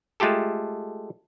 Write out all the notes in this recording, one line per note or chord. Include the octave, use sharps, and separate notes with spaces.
G#3 A3 F4 G4 A4